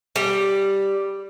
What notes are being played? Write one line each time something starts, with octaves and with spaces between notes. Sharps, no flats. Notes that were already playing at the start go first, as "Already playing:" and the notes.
G3